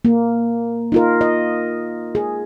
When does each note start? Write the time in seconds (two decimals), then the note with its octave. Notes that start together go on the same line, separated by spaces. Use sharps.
0.05 A#3
0.92 D#4 F4 A#4
1.21 D#5
2.15 G#4